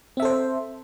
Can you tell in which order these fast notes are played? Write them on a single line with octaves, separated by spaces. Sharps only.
C4 E5 A4 C5